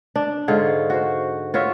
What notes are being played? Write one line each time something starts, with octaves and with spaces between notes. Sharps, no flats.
D4
G#2 D3 F4 C#5
F#4 C5
F4 F#4 C#5 E5